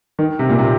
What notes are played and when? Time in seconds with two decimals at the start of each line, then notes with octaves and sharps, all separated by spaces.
0.19 D#3
0.39 C3
0.49 A#2
0.59 C3